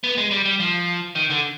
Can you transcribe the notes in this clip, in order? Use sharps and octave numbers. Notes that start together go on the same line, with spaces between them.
B3
G#3
G3
G3
F3
D#3
D3